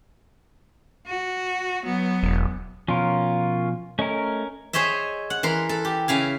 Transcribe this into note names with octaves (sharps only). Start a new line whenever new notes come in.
F#4
F#3 B3
E1
B2 F3 C#4 F4 A#4
A3 C#4 A#4 D#5
G#4 C5 C#5 D#5 E5
F#5
E3 A#4 C6
A4
G4
C#3 E4 F5 G#5